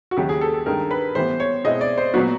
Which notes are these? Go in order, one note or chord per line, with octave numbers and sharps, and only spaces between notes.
F#4
D#2 C#3 F#3 G4
G#4
A4
A4
G2 D#3 G#3 A#4
B4
A2 E3 G3 B3 C5
C#5
B2 G#3 C4 E4 D#5
D5
C5
A#2 F#3 B3 F#4